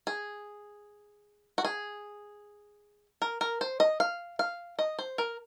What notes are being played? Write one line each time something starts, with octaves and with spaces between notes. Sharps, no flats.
G#4
F#4
G#4
A#4
A#4
C5
D#5
F5
F5
D#5
C5
A#4